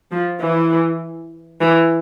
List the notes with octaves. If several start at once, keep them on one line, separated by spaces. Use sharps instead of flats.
F3
E3
E3